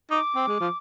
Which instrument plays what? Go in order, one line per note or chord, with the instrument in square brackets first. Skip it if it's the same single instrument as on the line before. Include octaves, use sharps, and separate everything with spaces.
[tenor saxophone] D#4 [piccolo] D6
[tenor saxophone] C4
G#3
F3